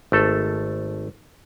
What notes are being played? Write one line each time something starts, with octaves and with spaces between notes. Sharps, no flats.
G#1 A3 A4